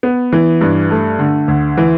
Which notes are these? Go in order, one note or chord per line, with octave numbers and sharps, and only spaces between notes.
B3
E3
G2
A3
D3
D2
E3